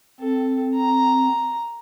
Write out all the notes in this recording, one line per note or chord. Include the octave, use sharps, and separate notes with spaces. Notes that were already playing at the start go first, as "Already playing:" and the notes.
C4 A4
A#5